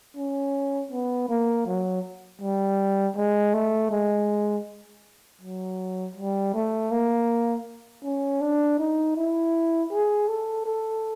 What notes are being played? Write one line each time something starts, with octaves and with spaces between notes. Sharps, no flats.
C#4
B3
A#3
F#3
G3
G#3
A3
G#3
F#3
G3
A3
A#3
C#4
D4
D#4
E4
G#4
A4
A4